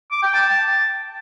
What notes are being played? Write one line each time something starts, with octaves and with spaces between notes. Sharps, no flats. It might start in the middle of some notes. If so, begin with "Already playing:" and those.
D6
G5
A5